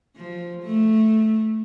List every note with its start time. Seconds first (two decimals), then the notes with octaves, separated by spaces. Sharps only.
0.17 F3
0.63 A3